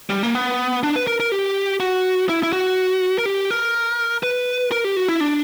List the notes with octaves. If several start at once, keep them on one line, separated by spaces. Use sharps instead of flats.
G3
A#3
B3
D4
B4
A#4
A#4
G4
F#4
E4
E4
F#4
A#4
G4
A#4
B4
A#4
G4
F#4
E4
D4